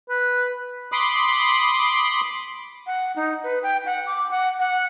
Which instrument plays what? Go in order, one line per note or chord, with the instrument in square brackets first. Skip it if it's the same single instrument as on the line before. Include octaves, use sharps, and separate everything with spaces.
[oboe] B4
[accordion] B5 C6 D6 D#6
[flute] F#5
D#4
B4
G5
F#5
D6
F#5
F#5